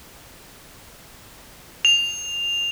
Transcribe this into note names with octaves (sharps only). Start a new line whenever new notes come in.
F7